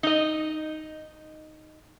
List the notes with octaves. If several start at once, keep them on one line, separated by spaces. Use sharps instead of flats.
D#4 D#5